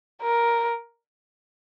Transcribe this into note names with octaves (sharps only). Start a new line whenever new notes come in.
A#4